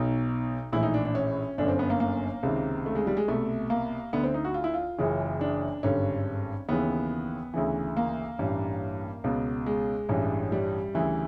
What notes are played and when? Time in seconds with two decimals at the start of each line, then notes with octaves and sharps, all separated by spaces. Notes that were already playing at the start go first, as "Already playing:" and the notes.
Already playing: B1 B2 D#4
0.72 A#1 A2 E3 E4
0.83 D#4
0.94 D4
1.05 D4
1.15 C#4
1.58 G1 F#2 D3 D4
1.68 C4
1.79 B3
1.90 A#3
2.00 A#3
2.43 C#2 C3 D#3
2.86 A3
2.95 G#3
3.07 G3
3.17 G#3
3.28 C2 B2 A3
3.70 A#3
4.13 D2 D3 B3
4.24 C4
4.34 D#4
4.45 F#4
4.54 F4
4.64 E4
4.74 F4
4.98 F#1 F#2 C#3 E3
5.41 D4
5.83 G#1 G2 D3 C#4
6.68 D#2 C#3 E3 B3
7.54 D2 C#3 E3
7.97 A#3
8.39 A1 G2 E3
9.24 C#2 B2
9.66 G#3
10.09 A1 G2 E3
10.52 G3
10.94 D2 C#3 E3